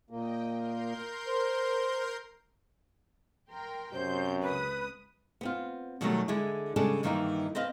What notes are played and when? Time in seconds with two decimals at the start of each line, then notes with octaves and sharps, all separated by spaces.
0.10 A#2 A#3 D#5 G5
0.52 A#4 C6 G6
1.27 C5
3.50 A#4 G5 C6
3.93 F#2 C3 C5 G6
4.42 C#2 B4 D#6
5.41 B3 C4 F4
6.01 B2 D#3 F#3 G3 A3
6.28 D3 G#3 E4
6.76 C#3 G3 G#3 D4 A4
7.03 G2 D#3 E3 A#3 C#4 D#4
7.55 C4 B4 D#5 F5